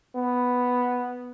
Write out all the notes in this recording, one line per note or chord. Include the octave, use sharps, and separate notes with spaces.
B3